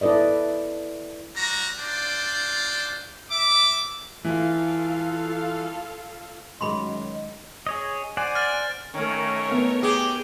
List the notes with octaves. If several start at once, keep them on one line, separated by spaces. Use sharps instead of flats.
E4 A4 B4 D5 D#5
G3 F#4 A#5
D4 F4 C5 D5
E5 D6
E3 F4 A4 F5
F#2 D#3 G#3 G#4 D#5 B5 C6
G#4 C#5 D#5
C5 D5 F#5 G#5
F6 A6
D#3 A3 C#4 A#4 C#5
B3
G4 G#4